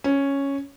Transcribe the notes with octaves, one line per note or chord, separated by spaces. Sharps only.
C#4